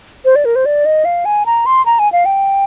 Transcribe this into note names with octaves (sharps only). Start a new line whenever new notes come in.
C5
D5
A#4
C5
D5
D#5
F5
G#5
A#5
C6
A#5
G#5
F5
G5